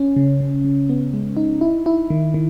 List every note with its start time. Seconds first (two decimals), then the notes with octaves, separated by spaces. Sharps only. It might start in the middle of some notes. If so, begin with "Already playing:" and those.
Already playing: C#4
0.16 C#3
0.40 C#3
0.65 C#3
0.89 B3
1.14 G#3
1.37 D#4
1.61 E4
1.86 E4
2.10 D#3
2.34 D#3